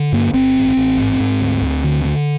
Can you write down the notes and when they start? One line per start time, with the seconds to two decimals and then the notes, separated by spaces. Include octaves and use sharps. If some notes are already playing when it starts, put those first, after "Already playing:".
Already playing: D3
0.12 G2 A#3
0.34 G1 C4
0.56 A1
0.77 A1
0.98 G#2
1.20 G#2
1.41 D2
1.61 D2
1.84 D3
2.05 D3